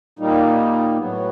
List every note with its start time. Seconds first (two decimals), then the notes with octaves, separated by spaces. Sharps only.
0.19 A#2 G3 A#3 D#4
0.97 A2 F#3 B3